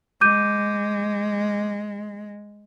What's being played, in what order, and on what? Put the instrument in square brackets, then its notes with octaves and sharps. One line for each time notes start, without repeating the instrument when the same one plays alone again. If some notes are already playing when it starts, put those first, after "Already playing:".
[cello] G#3 [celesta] D6 G6 D#7